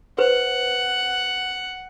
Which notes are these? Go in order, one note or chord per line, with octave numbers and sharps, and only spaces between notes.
B4 C5 F#5